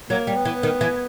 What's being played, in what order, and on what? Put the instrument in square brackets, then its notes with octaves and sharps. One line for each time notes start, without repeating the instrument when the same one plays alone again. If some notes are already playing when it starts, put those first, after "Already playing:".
[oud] F#3 [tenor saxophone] A#3
[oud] G3
[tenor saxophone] B3
[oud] E3
D#3
E3